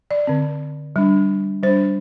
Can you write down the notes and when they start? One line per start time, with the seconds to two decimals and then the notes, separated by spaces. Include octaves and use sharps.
0.11 D5
0.27 D3 C4
0.96 G3 D4
1.63 G3 C5
1.67 D4